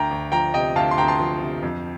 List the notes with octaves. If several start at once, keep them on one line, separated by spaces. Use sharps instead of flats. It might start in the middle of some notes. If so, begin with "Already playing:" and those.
Already playing: D2 G5 A#5
D2
F3 G5 A#5
C3 D#5 G5
D2 F5 A5
C6
D2 G5 A#5
A5 C6
F3
C3
F2